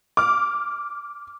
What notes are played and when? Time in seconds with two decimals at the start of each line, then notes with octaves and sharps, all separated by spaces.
0.17 D6 F6